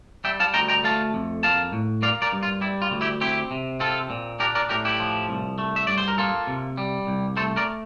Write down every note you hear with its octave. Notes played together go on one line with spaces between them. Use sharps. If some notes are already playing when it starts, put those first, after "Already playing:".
G3 E5 G5
F5 A5
D2 G5 A#5
G5 A#5
A3 F5 A5
F2
A#3 F5 A5
A2
A#3 D5 F5
A#4 D5
G2
F4
G3 E4
F4
D2
E4 G4
C4 E4 G4
C3
C4 F4 A4
A#2
D4 G4 A#4
A#4 D5
A2 G4 A#4
E4 G4
F3
C2
A3
E5
G2 D5
C5
A#4
A#3 F4 A4
C3
G3
C2
A3 A4 C5
A#4 D5